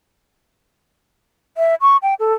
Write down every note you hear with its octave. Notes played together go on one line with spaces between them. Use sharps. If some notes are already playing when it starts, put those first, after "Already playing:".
E5
C#6
G5
A4